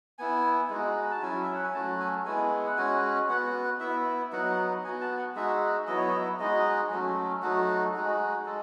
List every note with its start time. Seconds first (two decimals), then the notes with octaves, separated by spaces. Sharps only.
0.18 B3 E4 G#5
0.70 G#3 D#4 F#4
1.11 A5
1.22 F#3 C#4 E4 G#5
1.43 E5
1.55 F#5
1.64 G#5
1.73 F#3 A3 C#4 F#4 A5
2.00 G#5
2.26 G#3 B3 E4 G#5
2.67 F#5
2.77 G#3 C#4 F#4 G#5
3.29 B3 F#4 F#5
3.80 B3 E4 E5
4.32 F#3 B3 D#4 F#4 F#5
4.84 B3 G#5
4.88 F#4
5.01 A5
5.19 F#5
5.35 G#3 D#4 F#4 E5
5.87 F#3 B3 E4 D#5
5.98 C#5
6.07 D#5
6.39 G#3 D#4 F#4 D#5
6.90 F#3 A3 C#4
7.42 F#3 A3 D#4 F#4
7.94 G#3 D#4 F#4
8.46 G#3 A4